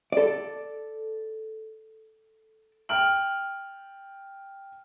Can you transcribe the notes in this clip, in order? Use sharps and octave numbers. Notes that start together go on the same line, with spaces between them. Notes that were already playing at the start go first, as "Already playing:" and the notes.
A4 D5
G5 F6 D7 F#7